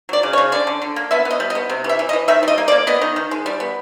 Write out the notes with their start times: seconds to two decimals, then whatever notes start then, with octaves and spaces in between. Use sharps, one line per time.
0.09 F#3 D5
0.23 C#3
0.33 C#5
0.38 C#3
0.52 D3 D5
0.67 D3
0.82 D3
0.96 A#3
1.11 B3 E5
1.25 B3
1.31 D#5
1.40 G3
1.50 D#5
1.55 B3
1.70 C3
1.84 E3
1.89 E5
1.99 E3
2.09 D#5
2.13 E3
2.28 D#3 E5
2.43 G3 D#5
2.58 A#3
2.68 D5
2.72 A#3
2.87 B3 D#5
3.02 D#3
3.16 D#3
3.31 G#3
3.46 G3
3.60 B3